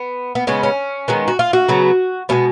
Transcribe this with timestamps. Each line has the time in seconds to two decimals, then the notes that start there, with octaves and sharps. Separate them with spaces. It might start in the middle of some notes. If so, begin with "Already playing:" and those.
Already playing: B3
0.35 B3
0.47 C#3 G#3 B3 C#4
0.63 C#4
1.08 D#3 G#3 B3
1.28 F#4
1.39 F4
1.53 F#4
1.68 C#3 F#3 B3
2.29 B2 G#3 B3 C#4